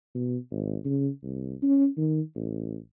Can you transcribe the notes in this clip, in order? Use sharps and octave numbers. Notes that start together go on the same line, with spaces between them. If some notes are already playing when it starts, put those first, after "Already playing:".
B2
G#1
C#3
C2
C#4
D#3
A1